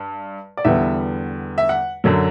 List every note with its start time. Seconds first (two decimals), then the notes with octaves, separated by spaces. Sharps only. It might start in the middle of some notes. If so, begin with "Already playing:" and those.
Already playing: G2
0.57 D5
0.64 E2 D3 G3 B3 E5
1.58 E5
1.69 F#5
2.04 F#2 D3 F#3